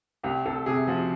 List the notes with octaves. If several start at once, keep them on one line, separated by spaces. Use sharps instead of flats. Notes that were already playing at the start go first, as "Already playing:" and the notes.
C2 G4
C2 A4
C3 G#4
F3 F#4